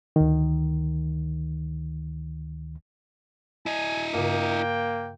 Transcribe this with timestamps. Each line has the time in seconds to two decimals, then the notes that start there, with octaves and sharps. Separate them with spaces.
0.16 D2 D#3
3.66 E4 D#5 G#5
4.14 G2 C#3 A#3 G5